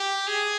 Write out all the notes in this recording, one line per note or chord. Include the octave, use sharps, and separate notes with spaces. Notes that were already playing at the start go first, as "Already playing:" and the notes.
Already playing: G4
G#4